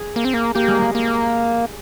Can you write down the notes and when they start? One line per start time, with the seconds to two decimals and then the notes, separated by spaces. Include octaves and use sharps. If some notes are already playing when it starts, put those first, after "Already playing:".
Already playing: G#4
0.16 A#3
0.25 C4
0.34 A#3
0.55 A#3 G4
0.68 G#3
0.81 G#3
0.95 A#3